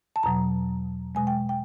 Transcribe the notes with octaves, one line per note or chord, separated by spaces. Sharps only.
A5
E2 B2 F#3 A#5
B2 G#3 G#5
G5
G5